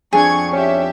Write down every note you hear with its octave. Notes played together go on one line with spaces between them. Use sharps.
F2 D4 G#4 C#6 F#6 G#6
C#4 G4 E5